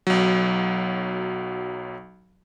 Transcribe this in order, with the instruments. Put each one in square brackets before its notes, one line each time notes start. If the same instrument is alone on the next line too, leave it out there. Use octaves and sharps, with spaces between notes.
[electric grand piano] B1 F#3